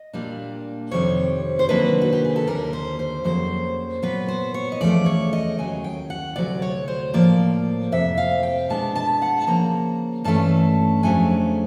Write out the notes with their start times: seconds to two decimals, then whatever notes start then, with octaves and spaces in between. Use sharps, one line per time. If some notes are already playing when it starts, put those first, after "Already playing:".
Already playing: D#5
0.13 A#2 G3 A#3 D4
0.91 F2 C3 D#3 G3 C4 C#5
1.59 C5
1.69 C3 D#3 F#3 A#3 D4 B4
2.01 F#4
2.13 G4
2.25 G#4
2.36 A4
2.47 D#2 D3 G3 A#4
2.73 C5
2.99 C5
3.24 F2 C#3 F#3 A#3 C5
4.02 A#2 F#3 B3 B4
4.28 C5
4.54 C#5
4.72 D#5
4.80 E2 C#3 F3 A3 D5
5.06 C#5
5.33 D#5
5.59 D#2 C#3 F#3 G#5
5.84 G5
6.10 F#5
6.36 D2 C3 F#3 D5
6.62 C#5
6.88 C5
7.14 A2 F3 A#3 D5
7.92 F2 C3 E5
8.18 F5
8.43 G5
8.69 B2 G#3 B3 D4 A5
8.95 A5
9.22 F#5
9.41 A5
9.47 C#3 F3 A#3 A#5
10.24 G2 E3 A3 C#4 A5
11.03 F2 C#3 F#3 A3 D4 G#5